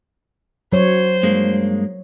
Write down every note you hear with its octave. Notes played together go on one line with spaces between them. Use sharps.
F#3 C5 C#5
G2 G#3 A#3